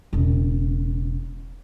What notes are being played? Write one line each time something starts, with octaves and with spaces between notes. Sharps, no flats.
E1 C#3